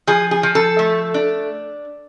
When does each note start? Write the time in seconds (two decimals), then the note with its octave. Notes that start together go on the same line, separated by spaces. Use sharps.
0.07 F3 G#4
0.31 G#4
0.43 F3
0.55 A4
0.79 A3
1.14 D4